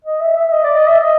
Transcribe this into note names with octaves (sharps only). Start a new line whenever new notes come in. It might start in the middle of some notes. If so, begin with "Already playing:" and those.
D#5
E5
E5
D#5
D5
D#5
E5
D#5